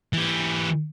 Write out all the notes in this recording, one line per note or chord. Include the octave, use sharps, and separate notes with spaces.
E3 G4